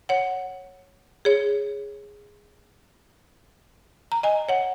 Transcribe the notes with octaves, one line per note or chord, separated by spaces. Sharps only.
C#5 F#5
G#4 C#5
A#5
D#5 G#5
C#5 F#5